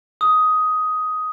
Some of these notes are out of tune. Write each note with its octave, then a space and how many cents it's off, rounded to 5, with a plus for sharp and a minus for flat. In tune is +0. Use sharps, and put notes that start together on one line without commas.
D#6 +10